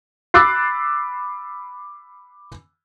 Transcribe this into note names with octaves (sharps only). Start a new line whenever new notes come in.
B5 D6 E6 F#6 A6 C7